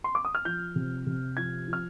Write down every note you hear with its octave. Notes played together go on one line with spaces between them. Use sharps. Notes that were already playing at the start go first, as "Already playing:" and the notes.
C6
D6
D#6
F6
F3 G6
C3
C3
F3 G#6
F3
F6